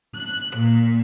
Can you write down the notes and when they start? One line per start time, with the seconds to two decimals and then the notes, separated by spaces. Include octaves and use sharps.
0.17 F#6
0.56 A#2